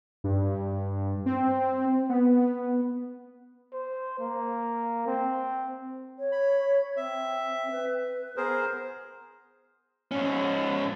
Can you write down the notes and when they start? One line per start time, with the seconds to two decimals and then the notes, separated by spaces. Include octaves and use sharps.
0.24 G2
1.26 C4
2.09 B3
3.73 C5
4.19 A#3
5.07 C4
6.19 C#5
6.32 B5
6.96 C4 E5
7.71 B4
8.37 B3 G#4 A#4 C5
10.11 G#2 C#4